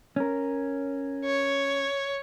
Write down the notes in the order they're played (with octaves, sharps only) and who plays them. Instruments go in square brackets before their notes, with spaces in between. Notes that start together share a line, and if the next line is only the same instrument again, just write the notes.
[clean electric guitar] C#4 A#4
[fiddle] C#5